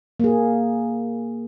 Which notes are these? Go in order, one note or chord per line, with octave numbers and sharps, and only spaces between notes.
A#3 G#4